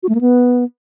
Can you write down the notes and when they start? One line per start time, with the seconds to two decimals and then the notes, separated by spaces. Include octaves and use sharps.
0.03 F#4
0.09 A3
0.15 A#3
0.21 B3